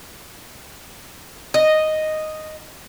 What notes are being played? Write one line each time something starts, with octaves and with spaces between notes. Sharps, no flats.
D#5